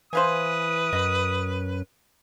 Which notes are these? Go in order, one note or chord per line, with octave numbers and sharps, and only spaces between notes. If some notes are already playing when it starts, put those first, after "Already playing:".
E3 B4 C5 F5 G#5 D#6
F#2 D#5